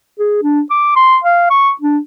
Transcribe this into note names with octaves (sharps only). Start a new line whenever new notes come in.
G#4
D4
D6
C6
F5
C#6
D4